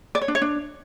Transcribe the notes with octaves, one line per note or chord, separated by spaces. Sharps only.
D5
C#5
D4
C#5
D4